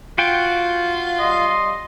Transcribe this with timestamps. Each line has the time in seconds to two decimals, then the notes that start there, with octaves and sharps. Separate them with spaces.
0.18 F4 F#4 G5
1.19 G3 D#5 C6